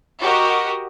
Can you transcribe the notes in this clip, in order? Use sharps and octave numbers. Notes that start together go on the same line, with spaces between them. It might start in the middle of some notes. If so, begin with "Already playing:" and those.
F#4 G4 A#4 D#5